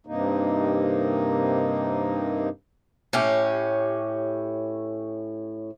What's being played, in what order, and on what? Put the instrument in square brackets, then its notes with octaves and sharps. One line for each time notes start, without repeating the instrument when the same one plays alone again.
[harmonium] G2 C3 A#3 D#4
[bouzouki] A2 C#4 G4